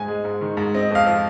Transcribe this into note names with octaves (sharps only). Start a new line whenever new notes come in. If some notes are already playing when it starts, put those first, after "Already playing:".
Already playing: G#2 G#5
G#3
G#2
D#3
G#2
C4 D#5
F2 F5
F3